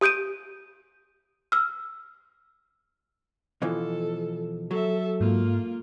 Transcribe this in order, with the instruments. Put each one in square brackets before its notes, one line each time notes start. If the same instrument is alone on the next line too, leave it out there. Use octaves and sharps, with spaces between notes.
[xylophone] G4 D#6 G6 D7 D#7
E6 F6
[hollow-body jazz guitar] B2 E3 F3 [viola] A4
[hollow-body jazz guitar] F#3 [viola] A4 E5
[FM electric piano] G#2 [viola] A#3 F4